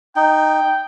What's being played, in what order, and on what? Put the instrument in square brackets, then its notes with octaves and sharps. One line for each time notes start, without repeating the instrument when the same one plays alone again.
[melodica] D#4 [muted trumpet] G5